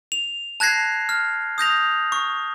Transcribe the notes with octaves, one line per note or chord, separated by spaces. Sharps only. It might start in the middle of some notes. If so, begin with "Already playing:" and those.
F7
A5 F#6 G#6 A#6 C7
F6
D#6 G6 A#6 F7
C#6